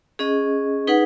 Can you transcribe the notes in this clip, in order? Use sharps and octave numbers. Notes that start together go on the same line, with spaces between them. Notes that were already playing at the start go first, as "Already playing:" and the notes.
C#4 G#4 D#5
D#4 G#4 B4 F#5